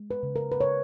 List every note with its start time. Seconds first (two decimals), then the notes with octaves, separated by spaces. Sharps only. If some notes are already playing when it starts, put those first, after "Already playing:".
Already playing: G#3
0.11 B4
0.23 C#3
0.36 A#4
0.52 B4
0.61 C#3 C#5